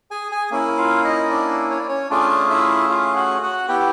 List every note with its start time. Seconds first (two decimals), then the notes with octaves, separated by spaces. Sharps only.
0.11 G#4 G#5
0.32 G#4 G#5
0.51 A#3 C#4 E4
0.78 F4 F5
1.04 D#4 D#5
1.30 D4 D5
1.71 C#5
1.79 D5
1.88 C#4 C#5
2.10 A3 C#4 D4 F4 G#4 D5
2.50 E4 E5
2.90 F4 F5
3.15 F#4 F#5
3.42 F#4 F#5
3.68 B3 E4 G4 G5